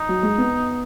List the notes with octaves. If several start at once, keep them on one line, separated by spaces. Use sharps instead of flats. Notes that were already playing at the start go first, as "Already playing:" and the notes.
Already playing: D#4
F#3
G#3
B3